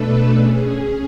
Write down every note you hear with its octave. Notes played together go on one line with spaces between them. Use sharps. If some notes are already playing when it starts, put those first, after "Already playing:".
Already playing: B2 A3 D4 A4 B4
C#4 G#4